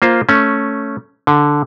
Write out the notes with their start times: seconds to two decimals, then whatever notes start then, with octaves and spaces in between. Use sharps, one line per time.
0.02 A#3 F4 C5
0.29 A3 C#4
1.27 D3